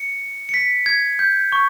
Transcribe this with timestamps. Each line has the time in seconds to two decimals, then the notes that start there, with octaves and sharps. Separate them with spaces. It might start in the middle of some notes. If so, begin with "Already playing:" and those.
Already playing: C#7
0.49 C#7
0.54 B6
0.86 G#6
1.19 G6
1.52 C#6